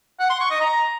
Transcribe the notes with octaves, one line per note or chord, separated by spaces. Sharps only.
F#5
C6
C#6
D#5
A#5